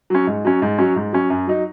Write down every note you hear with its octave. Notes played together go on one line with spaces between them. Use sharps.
F#3 C#4
G#2
F#3 C#4
G#2
F#3 C#4
G#2
F#3 C#4
F#2
F#3 D#4